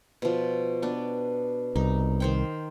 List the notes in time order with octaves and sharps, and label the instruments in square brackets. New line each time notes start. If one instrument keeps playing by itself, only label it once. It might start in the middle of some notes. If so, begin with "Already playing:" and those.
[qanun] B2 F3
B3 D4
[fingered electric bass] C2 [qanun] D#4
[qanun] D#3 C5 G5